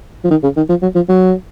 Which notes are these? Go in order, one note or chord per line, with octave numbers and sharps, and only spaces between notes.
F3
D#3
C#3
D#3
F3
F#3
F3
F#3